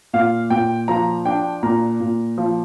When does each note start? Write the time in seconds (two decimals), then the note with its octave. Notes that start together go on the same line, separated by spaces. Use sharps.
0.13 A#2 F5
0.50 A#2 G5
0.88 F3 A#5
1.25 D4 G5
1.63 A#2 A#5
2.00 A#2
2.38 F3